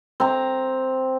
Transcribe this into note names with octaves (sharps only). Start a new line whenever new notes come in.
C4 A#5